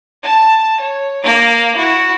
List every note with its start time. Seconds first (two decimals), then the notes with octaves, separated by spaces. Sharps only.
0.23 A5
0.80 C#5
1.23 A#3 D6
1.76 E4 F#4